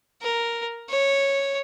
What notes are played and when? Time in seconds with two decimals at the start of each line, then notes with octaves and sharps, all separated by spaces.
0.22 A#4
0.90 C#5